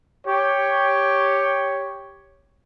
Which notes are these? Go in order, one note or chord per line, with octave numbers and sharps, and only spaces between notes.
G4 C#5